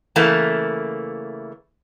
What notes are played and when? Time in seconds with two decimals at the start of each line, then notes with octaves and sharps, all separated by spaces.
0.16 C#3 E3 A3 A#3